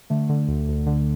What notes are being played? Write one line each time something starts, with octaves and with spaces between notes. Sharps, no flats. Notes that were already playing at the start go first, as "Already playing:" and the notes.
D3 A3
D3
D2
D2
D3